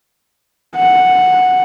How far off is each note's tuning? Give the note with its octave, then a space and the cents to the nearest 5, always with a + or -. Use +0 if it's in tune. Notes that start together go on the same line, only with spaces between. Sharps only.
F#5 -5